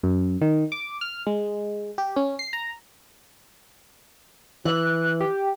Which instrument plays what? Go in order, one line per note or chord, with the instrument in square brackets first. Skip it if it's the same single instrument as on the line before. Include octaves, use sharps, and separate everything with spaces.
[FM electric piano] F#2
D#3
D6
F6
G#3
G4
C#4
C7
A#5
[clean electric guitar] E3 [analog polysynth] F#6
[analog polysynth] G4